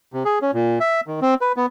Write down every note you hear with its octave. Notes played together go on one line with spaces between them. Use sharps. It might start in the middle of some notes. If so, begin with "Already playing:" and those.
C3
G#4
C#4
A#2
E5
D#3
C4
B4
B3